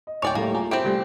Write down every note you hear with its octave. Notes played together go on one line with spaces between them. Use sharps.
D#5
D1 C#5 D5 G5 G#5 D6
A2 G3 A3 A#3
F4 G#4 A#5
C4 E4 G4 D7
C3 G3 A3